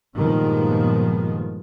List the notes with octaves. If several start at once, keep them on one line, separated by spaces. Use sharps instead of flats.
G2 A#2 D#3 F3 G#3 B3